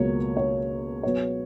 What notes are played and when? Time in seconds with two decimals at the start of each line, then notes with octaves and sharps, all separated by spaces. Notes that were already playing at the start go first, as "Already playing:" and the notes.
Already playing: C#2 B2 F#3 A#3 C#5
0.37 C#5
1.03 B2 F#3 B3 C#5